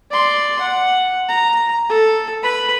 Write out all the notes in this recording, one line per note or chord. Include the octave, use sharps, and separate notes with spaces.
D5 C6
F#5
A#5
A4
B4 B5